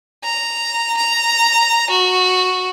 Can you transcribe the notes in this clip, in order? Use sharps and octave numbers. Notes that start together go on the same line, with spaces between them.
A#5
A#5
F#4